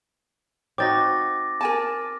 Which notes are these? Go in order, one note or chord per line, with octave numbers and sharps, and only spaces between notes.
C4 D#4 F#4 D6 A6 A#6
A#4 G#5 A5